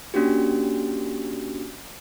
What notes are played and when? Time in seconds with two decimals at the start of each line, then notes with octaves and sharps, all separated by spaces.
0.14 A#3 C#4 D4 F#4 G4